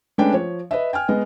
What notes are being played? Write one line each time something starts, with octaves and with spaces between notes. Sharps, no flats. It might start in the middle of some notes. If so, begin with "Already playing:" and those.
G#3 A3 C#4 D4 B4 G5
F3 C#5
B4 D#5 E5
G5 G#5 F6
G#3 B3 D#5